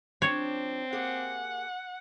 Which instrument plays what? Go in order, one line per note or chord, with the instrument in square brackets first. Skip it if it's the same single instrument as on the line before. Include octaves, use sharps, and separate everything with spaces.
[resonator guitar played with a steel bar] F3 D4 G4 [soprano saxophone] C4 [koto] C#5
[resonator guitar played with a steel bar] A#3 G4 G#4 [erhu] F#5